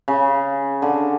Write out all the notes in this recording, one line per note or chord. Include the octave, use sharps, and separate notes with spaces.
C#3
D3